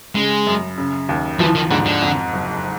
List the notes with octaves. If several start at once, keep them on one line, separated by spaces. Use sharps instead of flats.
C#3 G#3
F#2
C#3
D#2
E3 F3
D#3
G#2 D3
D3
F2
F#1